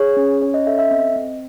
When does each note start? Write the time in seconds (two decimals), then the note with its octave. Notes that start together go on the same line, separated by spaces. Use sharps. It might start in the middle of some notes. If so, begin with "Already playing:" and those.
Already playing: G#4 C#5
0.17 C#4
0.42 C#4 C#5
0.54 D#5
0.67 A4 E5
0.79 E5
0.91 C4 D#5
1.16 C4